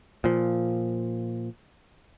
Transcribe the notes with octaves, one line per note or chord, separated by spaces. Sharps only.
A#2 F3